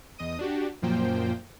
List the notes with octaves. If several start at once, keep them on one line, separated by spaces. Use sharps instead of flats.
E2 D#5 D#6
D4 F#4 G4
F#2 A#2 F3 A#3 C5 G5